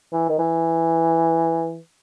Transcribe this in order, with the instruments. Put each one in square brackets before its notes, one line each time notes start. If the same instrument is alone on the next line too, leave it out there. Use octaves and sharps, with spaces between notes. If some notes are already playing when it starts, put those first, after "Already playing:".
[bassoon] E3
D#3
E3